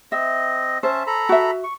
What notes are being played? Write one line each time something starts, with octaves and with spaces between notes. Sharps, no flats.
C4 D#5 E5
C#4 C5 E5 A5
A4 A#5 B5
F#4 E5
C#6